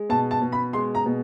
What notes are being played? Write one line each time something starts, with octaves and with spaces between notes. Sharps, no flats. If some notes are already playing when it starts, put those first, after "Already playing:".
Already playing: G#3
B2 A5
A5
B2
B5
G#3 C6
A#5
B2